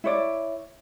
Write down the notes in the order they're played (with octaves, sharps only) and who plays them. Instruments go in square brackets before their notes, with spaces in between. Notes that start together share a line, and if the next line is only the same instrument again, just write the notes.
[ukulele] E4 C#5 D5